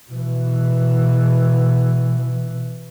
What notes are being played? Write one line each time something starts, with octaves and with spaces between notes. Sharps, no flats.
B2 E3